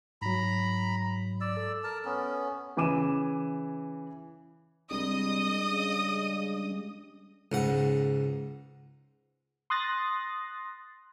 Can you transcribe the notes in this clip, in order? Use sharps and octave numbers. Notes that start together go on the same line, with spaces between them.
G#2 F#3 A#5 B5
D5 E6
A4
A#4 A5
B3 C#4
C#3 E3 G#5 D6 D#7 E7
C2 G3 G#3 D4 D#5 D#6
C#3
C#2 G#2 F#5
C6 D#6 F#6 A6 A#6